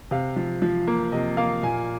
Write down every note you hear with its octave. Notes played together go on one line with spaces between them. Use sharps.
C3 F5
F3
F3
A#3
C3 D#5
A#3 F5
A#2 G#5